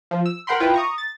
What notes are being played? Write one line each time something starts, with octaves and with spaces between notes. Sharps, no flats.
F3
E6
A#4 F#5 G5 B5 C6
E4 F4 B4 G5
A#5 C#6 D#6
A6